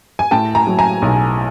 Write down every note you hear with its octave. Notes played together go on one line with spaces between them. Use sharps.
G#5
A2 G5 A5
G#5 A#5
F#3
G#5 A#5
B1